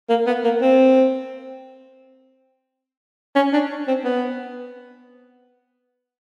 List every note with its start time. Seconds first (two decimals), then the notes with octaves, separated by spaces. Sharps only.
0.09 A#3
0.27 B3
0.44 A#3
0.61 C4
3.36 C#4
3.53 D4
3.88 C4
4.05 B3